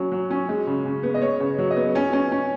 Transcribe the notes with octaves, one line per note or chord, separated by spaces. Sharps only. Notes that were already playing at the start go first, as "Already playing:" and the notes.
Already playing: F#3 C#4
F#3
C#4
G#3
C#3
C#3
B3
D#5
B3 C#5
C#3
F#3
D#5
B3
C#4 C#5
C#4
C#4